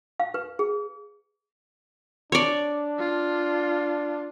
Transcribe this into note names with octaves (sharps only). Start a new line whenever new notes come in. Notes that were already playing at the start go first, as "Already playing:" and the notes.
F5
B4
G#4
D4 C#5 D5
F4